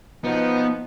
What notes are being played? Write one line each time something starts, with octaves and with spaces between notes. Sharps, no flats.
B2 F3 B3 D#4